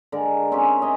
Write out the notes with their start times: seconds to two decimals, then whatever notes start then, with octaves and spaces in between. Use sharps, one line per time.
0.12 D3 G#3 A#4 D5
0.52 C4 C#4 G4 F5
0.82 D#5 E5 G#5 A#5